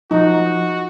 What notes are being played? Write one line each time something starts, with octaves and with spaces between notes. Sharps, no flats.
F3 D#4 F#4